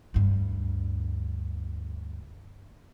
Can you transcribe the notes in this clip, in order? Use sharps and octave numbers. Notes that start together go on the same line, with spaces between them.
D2 G2